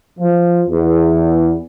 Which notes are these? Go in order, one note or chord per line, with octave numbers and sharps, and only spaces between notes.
F3
E2